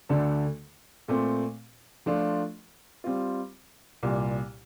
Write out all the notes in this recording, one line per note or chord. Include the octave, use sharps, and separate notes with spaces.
D2 D3 A3 D4 A4
A#2 A3 C4
F3 A3 D4 F4
G3 C4 F4
C2 A#2 G3